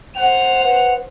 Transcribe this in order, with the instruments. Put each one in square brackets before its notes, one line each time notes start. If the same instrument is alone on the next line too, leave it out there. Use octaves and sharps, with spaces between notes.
[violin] C5 F7 [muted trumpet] F#5
[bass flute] B4 [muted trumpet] F#5